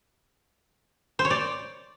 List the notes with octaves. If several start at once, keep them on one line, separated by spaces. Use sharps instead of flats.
C5
C#5
D5